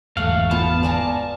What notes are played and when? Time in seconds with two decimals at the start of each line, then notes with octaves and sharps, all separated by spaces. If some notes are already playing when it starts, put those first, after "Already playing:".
0.17 G1 E2 G#2 A3 F5 F#5
0.51 B3 F4 A5
0.83 D5 G#5 A#5